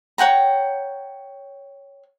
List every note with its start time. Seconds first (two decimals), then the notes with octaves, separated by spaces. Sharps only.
0.18 C#5 F#5 G5 A#5